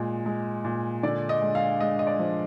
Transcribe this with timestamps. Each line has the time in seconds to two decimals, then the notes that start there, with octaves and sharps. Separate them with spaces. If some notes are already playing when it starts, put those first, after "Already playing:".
Already playing: A#2 G#3
0.26 G#3
0.65 A#2
1.03 D3 D5
1.29 D#5
1.42 G#3
1.55 F5
1.80 G#3 D#5
1.99 D#5
2.07 D5
2.20 F3